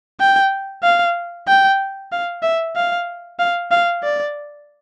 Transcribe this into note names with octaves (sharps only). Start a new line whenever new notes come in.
G5
F5
G5
F5
E5
F5
F5
F5
D5